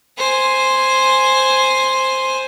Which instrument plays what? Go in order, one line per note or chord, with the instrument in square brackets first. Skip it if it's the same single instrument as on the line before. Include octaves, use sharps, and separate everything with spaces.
[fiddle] C5 G#5